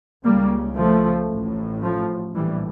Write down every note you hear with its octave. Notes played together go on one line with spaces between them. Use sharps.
C#2 C#3 G3 A#3
F3 A3
A1 A2
F3 A3
A#1 A2 E3 G3